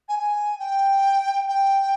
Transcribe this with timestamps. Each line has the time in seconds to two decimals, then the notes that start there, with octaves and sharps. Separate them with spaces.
0.08 G#5
0.19 G#5
0.59 G5
1.48 G5